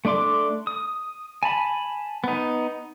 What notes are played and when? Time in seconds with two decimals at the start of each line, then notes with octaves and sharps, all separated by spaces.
0.05 A3 D4 D5 C6 D6
0.67 D#6
1.43 G#5 A5 B5
2.24 B3 D#4